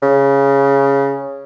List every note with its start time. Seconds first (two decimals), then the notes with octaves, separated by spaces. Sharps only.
0.03 C#3